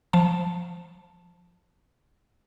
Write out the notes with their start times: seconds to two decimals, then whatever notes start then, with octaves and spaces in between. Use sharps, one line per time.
0.13 F3 A5